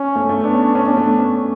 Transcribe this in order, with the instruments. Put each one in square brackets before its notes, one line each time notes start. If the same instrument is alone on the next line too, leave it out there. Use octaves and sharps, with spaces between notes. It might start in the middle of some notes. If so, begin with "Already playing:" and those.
Already playing: [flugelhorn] C#4
[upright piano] A3
A3
[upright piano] B3 [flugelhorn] D4
[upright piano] C#4
C#4
[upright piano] B3 [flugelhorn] D4
[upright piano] A3
C#4